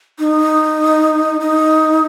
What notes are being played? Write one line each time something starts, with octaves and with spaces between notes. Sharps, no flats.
D#4
D#4